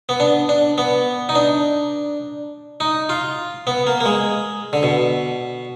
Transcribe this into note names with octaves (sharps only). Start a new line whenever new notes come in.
B3
D4
D4
B3
D#4
D4
D#4
F4
B3
A#3
A#3
G#3
D3
B2